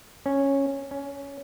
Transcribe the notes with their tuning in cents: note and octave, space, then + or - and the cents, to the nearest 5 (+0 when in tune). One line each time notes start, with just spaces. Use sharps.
C#4 -10
C#4 +10